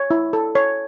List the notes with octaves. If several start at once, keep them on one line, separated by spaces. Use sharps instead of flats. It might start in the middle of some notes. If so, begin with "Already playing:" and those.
Already playing: C#5
E4
A4
C#5